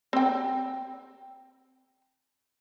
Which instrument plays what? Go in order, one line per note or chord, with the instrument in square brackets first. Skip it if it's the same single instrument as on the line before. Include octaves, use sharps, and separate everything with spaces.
[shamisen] C4 G5